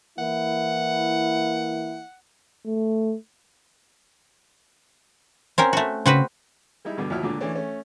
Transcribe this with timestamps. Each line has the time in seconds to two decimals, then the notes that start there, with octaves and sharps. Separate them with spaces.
0.18 E3 A#3 E4 F#5
2.66 A3
5.58 C4 C#4 A#4
5.73 A3 F#4
6.06 C#3 C4 F#4 B4
6.85 G3 G#3 D#4 E4
6.97 G2 B2 D3
7.10 D#2 F3 F#3 E4 F6
7.22 C#2 A#2 D3 D4
7.41 E3 A3 C#4 D4
7.55 A3 C#4